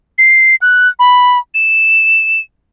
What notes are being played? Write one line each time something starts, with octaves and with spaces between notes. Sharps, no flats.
C7
F#6
B5
E7